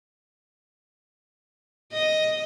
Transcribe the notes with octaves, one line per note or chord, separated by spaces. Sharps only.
D#5